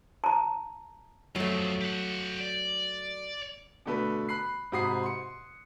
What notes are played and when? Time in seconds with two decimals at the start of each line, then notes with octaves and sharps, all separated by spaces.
0.24 A5 A#5
1.36 F#2 F3 F#3 A3
1.81 G4 F#5
2.40 D5
3.86 B2 D3 A3 B4
4.29 B5 F#6 C7
4.72 G#2 C3 F#4 B5 D#6 C7
5.03 C6 C#7